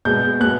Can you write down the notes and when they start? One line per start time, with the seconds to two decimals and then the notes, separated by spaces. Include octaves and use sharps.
0.05 B2 G#3 B3 G6
0.40 B2 G#3 B3 F#6